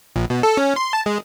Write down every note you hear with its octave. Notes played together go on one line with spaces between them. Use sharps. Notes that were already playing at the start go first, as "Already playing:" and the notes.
A#1
B2
A4
C#4
C6
A5
G#3